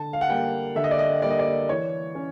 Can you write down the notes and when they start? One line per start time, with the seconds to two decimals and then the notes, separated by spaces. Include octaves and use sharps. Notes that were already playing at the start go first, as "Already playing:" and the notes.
Already playing: D3 A5
0.13 F5
0.21 F#5
0.29 G3 A#3 G5
0.75 D3 E5
0.84 D#5
0.91 D5
0.99 D#5
1.22 G3 A#3 D5
1.30 D#5
1.39 D5
1.69 E3 C#5
2.15 C#4